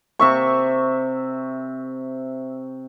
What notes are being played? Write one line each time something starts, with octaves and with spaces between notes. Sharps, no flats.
C3 E5 C#6